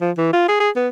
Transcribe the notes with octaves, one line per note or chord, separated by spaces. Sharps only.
F3
E3
F4
G#4
G#4
B3